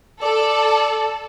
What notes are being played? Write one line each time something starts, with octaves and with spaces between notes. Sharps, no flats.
A4 D5